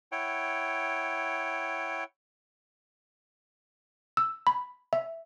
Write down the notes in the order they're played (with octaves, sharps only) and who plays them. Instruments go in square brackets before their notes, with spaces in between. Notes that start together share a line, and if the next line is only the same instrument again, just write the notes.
[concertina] E4 C#5 F#5 G5
[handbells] E6
B5
E5